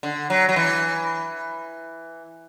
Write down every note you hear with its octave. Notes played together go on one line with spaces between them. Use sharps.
D3
F#3
F#3
E3